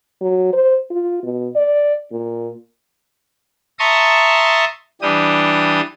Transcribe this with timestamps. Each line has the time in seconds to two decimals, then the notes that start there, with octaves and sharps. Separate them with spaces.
0.21 F#3
0.53 C5
0.90 F4
1.23 B2
1.55 D5
2.12 A#2
3.79 E5 A5 A#5 C6 C#6 D#6
5.02 E3 G3 D4 G4 D#6